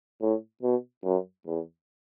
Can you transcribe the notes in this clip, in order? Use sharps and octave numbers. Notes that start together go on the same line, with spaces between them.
A2
B2
F#2
E2